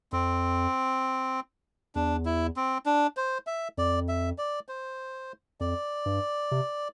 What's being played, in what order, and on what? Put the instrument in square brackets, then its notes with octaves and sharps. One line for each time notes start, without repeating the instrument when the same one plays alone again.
[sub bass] F2 [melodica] C4
[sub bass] E2 [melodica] D4
[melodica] E4
C4
D4
C5
E5
[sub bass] F2 [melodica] D5
[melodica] E5
D5
C5
[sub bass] F2 [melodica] D5
[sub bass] G2
C3